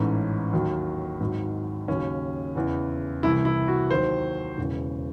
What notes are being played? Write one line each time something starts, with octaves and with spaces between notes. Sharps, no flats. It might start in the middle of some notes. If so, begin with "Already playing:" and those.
Already playing: A1 G#2 E3 C#4
D#2 D#3 F#3
G#1 G#2 D#3 F#3
D#2 C#3 F#3 C#4
E2 C#3 E3
C2 C3 E3 E4
E4
F#4
D#2 D#3 F#3 C5
E1 E2 C#3 E3